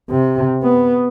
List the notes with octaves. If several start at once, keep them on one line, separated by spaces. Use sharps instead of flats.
C3
B3